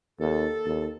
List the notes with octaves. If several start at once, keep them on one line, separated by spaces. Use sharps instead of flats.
D#2 A4
D#2